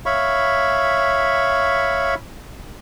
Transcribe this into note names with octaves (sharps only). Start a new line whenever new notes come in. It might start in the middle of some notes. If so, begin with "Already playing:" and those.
C#5 E5 F5 B5 C#6